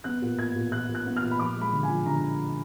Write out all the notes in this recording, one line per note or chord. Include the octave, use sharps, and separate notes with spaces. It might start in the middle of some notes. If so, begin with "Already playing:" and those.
B3 F#6
A#2
A#2 G#6
A#2
A#2 F#6
A#2
F#6
B3
F6
A#2
B5
F3 D6
G#3
B5
D3
G#5
F3
D3 A#5